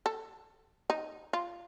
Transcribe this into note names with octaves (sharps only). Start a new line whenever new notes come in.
A4
D#4
F4